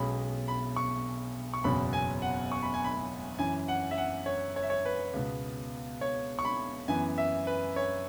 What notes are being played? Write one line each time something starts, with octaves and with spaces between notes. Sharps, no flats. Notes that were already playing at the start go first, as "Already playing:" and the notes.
Already playing: B1 B2 G#3 C#4 B5
B5
C#6
C#6
F#1 E2 B2 F#3 C#4 B5
G#5
F#5
C#6
B5
G#5
B5
F#2 E3 C#4 G#5
F#5
E5
F#5
C#5
C#5
E5
C#5
B4
C#2 B2 B3
C#5
C#6
B5
F#2 E3 B3 G#5
E5
B4
C#5